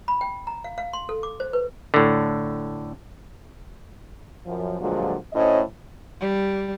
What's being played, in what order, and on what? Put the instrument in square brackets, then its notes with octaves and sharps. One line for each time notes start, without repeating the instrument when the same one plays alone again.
[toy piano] B5
G5
A#5
F5
F5
C6
A4
D6
C5
B4
[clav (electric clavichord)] A2 D3
[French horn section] F#2 F3
G2 A#2 D3 F3 F#3 G#3
D2 A2 C#4 C5 D#5
[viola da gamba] G3